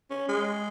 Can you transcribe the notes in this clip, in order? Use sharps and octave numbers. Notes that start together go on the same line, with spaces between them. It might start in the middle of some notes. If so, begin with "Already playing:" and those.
C#4
G#3